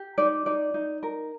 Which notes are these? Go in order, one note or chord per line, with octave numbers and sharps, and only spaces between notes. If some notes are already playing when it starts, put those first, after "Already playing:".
Already playing: G4
D#4 D5
D#4 D5
D#4
A#4